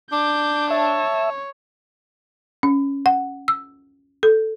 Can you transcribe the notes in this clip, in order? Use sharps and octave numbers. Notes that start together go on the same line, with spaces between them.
D4 D6 G6
C#5 E5 A5
C#4
F#5
E6
A4